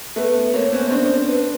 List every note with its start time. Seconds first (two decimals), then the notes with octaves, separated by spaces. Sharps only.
0.16 A3 B3 B4
0.53 A#3 C4 C#5
0.72 B3 C#4 C5
0.91 C4 D4
1.29 B4